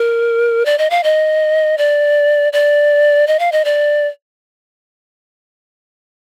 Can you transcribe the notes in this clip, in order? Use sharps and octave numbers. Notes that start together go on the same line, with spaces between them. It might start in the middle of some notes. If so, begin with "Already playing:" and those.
Already playing: A#4
D5
D#5
F5
D#5
D5
D5
D#5
F5
D#5
D5